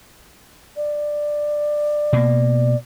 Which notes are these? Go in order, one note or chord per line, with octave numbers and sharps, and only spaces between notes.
D5
B2 A#3